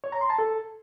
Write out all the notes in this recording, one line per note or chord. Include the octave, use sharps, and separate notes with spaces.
C#5
A#5
C6
A5
A4